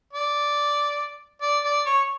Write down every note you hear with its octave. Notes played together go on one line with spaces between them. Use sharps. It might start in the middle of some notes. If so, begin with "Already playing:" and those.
D5
D5
D5
C#5